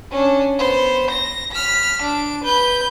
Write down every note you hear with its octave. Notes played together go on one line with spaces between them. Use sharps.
C#4 D4
B3 C5
A#6
F6 B6
D4 D7
B4 G6